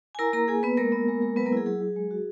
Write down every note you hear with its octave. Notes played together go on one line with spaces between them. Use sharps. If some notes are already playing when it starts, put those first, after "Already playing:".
G#5
E4 A#4 A#5
A#3 A#4 A#5
A#3 G#4 G#5
A#3 B3 B4
G#3 A#3 A#4
B3
G#3
G#3
F#3 B3 B4
A#3 A#4
E4 G#4
F#3 G#4
F#3
G#3
F#4